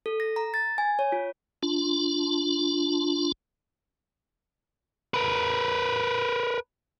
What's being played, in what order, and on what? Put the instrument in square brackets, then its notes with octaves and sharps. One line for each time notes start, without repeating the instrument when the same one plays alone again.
[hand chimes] A4
A#6
A#5
A6
G#5
C#5
F4
[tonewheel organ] D4 F4
[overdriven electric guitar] A#4 B4